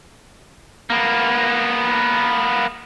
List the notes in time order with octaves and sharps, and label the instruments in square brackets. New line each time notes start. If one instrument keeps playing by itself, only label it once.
[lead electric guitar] A#3 B3